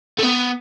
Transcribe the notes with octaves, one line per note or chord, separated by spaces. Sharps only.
A3
B3